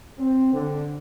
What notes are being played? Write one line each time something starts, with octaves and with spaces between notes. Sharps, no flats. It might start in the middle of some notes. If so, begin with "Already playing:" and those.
C4
D3